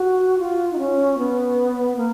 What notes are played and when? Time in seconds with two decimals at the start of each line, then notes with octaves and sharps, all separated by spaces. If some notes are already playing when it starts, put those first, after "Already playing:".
Already playing: F#4
0.39 F4
0.73 D#4
0.78 C#4
1.18 B3
1.97 A#3